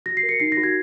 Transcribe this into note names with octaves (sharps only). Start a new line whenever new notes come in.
F#4 A#6
C7
A#4
C#7
D#4 C7
A#6
F#4
G#6